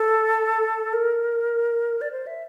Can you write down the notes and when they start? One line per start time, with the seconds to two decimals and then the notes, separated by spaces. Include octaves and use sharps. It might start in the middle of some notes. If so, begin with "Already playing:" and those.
Already playing: A4
0.93 A#4
2.01 D5
2.12 C5
2.27 E5